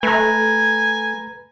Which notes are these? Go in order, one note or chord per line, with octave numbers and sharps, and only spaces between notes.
A3 B4 G#5 A#5